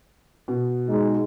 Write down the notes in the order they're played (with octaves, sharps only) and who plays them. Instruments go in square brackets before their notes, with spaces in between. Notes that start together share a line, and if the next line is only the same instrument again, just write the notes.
[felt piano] B2
[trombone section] G#3 D#4